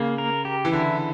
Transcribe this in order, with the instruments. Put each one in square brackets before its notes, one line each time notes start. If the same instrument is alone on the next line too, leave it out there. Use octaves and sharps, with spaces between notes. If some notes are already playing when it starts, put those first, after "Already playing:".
Already playing: [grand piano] C#3 [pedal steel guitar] A#3
[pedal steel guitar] A#4
G4
[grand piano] E3
[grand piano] D3 [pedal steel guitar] E4